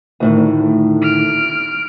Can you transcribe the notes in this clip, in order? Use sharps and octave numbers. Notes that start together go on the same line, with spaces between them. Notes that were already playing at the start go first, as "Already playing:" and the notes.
D2 A2 D#3
F6 D7